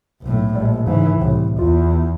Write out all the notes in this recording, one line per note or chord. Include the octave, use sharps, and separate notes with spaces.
B1 A2
A#1 G3
G#2 C#3 E3
C2 A2
E2 F4